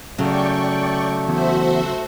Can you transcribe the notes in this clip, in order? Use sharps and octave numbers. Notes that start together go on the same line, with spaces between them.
C#3 F#3 A3 D5 G5 C#6
E2 F#4 C5 E5